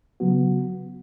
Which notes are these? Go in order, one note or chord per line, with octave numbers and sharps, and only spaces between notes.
C#3 F#3 B3 F#4